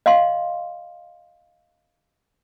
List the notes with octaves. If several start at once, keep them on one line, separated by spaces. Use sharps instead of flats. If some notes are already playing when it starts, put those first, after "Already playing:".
D#5 F5 C6